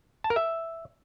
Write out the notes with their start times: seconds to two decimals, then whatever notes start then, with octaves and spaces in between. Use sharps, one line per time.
0.24 A5
0.30 A#4
0.36 E5